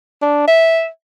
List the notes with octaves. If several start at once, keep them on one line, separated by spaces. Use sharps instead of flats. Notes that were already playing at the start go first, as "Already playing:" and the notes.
D4
E5